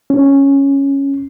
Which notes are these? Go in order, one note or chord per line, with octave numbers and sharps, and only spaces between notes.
C#4